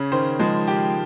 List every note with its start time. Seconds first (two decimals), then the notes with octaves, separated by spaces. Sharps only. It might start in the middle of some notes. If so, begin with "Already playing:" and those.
Already playing: C#3 C#4
0.12 D#3 C5
0.40 F3 G#3
0.68 G4